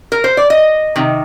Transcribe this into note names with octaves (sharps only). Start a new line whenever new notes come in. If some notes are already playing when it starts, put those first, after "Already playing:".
A#4
C5
D5
D#5
C3 D#3